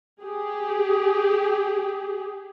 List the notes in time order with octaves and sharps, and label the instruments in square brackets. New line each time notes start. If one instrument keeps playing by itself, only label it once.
[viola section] G4 G#4